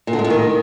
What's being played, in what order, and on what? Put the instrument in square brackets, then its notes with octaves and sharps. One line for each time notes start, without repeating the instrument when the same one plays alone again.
[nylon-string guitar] A#2
D3
G#3
A#2
D#3